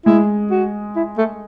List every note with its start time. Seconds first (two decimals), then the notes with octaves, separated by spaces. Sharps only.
0.06 G#3 E4
0.51 F#4
0.96 E4
1.18 A3